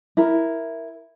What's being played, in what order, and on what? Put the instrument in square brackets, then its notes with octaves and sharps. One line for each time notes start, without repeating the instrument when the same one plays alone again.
[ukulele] E4 A#4